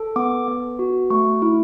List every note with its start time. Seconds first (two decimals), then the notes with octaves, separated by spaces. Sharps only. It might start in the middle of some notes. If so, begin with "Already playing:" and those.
Already playing: A4
0.16 B3 D6
0.48 B3
0.79 F#4
1.10 A3 C#6
1.42 E4